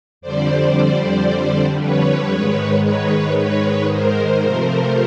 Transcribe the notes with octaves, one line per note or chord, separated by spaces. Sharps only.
F2 D3 G3 C5 D5
B4 C#5
G#2 D#3 G#3
B4 C#5
B4 C#5
A#4 C5
C3 F3 A3